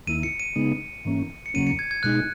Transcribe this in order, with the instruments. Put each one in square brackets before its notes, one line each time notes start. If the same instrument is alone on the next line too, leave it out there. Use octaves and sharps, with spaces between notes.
[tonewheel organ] D#2 D#3 A#3 E4 [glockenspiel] D#7
[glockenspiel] C#7
D#7
[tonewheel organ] C#3 G#3 B3 D#4
G#2 E3 A#3 C#4
[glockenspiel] C#7
[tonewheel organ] E2 C#3 F#3 A#3 C#4 [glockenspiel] D#7
[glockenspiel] C#7
G#6
G#6
[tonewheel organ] B2 G#3 D#4 [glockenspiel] F#6